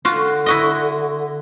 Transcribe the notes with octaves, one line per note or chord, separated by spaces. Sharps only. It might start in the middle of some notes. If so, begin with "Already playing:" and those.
D3 F4 F#4
E4 F#4 D#5